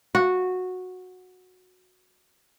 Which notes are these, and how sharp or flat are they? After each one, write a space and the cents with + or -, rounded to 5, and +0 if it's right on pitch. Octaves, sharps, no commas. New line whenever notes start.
F#4 -10